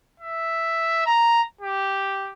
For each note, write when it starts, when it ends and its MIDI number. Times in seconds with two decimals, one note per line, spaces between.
0.20 1.01 76
1.06 1.41 82
1.61 2.33 67